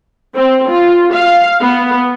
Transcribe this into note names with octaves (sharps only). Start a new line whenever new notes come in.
C4
F4
F5
B3